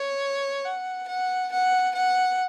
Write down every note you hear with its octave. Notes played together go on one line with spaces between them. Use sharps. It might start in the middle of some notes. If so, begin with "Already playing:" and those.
Already playing: C#5
F#5
F#5
F#5
F#5